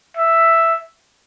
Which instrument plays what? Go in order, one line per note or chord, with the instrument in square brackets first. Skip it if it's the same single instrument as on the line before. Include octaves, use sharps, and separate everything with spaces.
[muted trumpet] E5